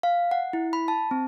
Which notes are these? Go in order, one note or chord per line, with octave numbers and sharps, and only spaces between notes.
F5
F#5
E4
B5
A5
C4